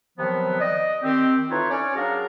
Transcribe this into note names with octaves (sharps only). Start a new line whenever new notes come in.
C3 D#3 F3 F#3 B3
D5 D#5
D#3 C4 G4
E3 D#4 F4 A4 B4 C#5
C#4 C#5 D5
F#3 D4 F#4 G#4 A#4 F5